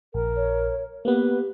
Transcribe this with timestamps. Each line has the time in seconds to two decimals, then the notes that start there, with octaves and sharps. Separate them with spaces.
0.14 A#1 A#4
0.36 C#5
1.05 A#3 B3 G4 B4